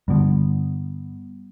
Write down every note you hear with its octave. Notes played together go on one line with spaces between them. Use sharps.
G2 D3 F3 G3 B3